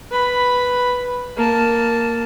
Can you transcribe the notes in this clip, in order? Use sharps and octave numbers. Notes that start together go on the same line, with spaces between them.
B4 B5
A#3 A5